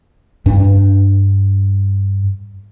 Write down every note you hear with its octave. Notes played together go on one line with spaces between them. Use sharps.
G2 D4